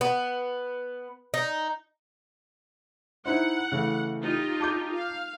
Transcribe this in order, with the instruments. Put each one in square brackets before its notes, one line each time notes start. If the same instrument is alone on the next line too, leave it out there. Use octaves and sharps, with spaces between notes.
[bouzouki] B3
D#4
[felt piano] D#4 E4 C5 [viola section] F#5
[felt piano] C#3 E3 A3
[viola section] D#4 F4 G4
[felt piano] A5 D6 G6
[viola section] F5